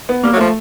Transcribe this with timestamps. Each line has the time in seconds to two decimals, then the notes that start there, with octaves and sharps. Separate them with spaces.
0.09 B3
0.23 G3 A#3
0.33 F#3
0.37 F3 A3